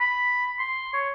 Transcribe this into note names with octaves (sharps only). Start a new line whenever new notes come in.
B5
C6
C#5